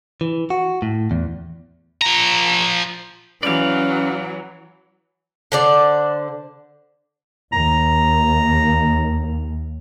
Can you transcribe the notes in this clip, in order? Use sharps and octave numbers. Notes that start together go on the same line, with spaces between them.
E3
F#4
A2
E2
F3 A#5
E3 F#3 C#4 D5 F5
D3 C5 D5
D#2 A#5